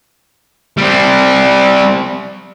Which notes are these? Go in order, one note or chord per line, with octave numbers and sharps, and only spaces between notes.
G3 C4